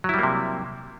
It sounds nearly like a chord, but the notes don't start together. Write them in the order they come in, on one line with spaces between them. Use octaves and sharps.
F#3 E4 G3 A#3 C3